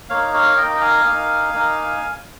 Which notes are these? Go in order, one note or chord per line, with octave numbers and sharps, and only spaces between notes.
A#3 D#4 C#5 F5
C#5 F5
A#3 D#4 D#5 G5
G5
F5 G#5
A#3 D#4
A#3 D#4